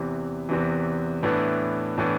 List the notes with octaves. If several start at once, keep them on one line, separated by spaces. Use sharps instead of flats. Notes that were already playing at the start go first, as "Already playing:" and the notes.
Already playing: E2 C3 E3
E2 C3 E3
A2 E3 B3 D4
A2 E3 B3 D4